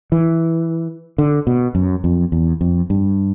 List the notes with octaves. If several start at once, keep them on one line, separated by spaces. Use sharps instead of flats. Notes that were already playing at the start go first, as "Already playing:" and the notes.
E3
D3
B2
F#2
F2
E2
F2
G2